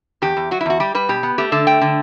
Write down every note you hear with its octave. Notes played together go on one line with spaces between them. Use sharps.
E2 G4
E2
F#3 F#4
E4
E2 F#4
G3 G4
G3 B4
B2 G4
B3
A3 G4
D3 A4
A3 G5
D3